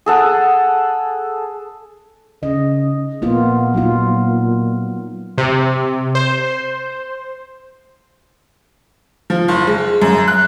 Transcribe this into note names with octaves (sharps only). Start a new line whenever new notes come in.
G#4 A4 F#5
C#3 D#5
A#2 A#3 B3 F4
F#3 D#4 F4
C3
C5
F3
F#1
G#3
F#2
F#6